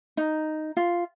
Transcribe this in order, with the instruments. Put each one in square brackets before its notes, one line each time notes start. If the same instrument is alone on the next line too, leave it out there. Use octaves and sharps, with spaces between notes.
[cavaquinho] D#4
F4